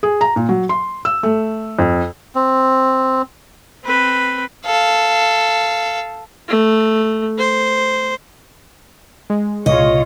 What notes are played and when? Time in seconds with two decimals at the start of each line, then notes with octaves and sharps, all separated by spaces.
0.03 G#4
0.21 A#5
0.36 A#2
0.49 F#3
0.69 C6
1.05 E6
1.23 A3
1.79 F2
2.35 C4
3.85 C4 B4
4.66 A4 F5
6.48 A3
7.38 C5
9.30 G#3
9.66 C2 A#2 C#3 F4 C#5 D#5